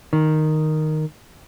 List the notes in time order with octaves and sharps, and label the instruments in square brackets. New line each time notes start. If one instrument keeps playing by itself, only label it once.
[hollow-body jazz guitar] D#3